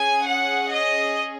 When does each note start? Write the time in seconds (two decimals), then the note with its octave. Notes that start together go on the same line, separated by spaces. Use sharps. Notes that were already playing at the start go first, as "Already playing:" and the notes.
Already playing: C#4 G#4 G#5
0.25 F#5
0.71 D#5